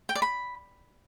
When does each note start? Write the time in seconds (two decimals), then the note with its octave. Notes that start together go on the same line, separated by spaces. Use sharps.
0.09 G5
0.15 D5
0.22 B5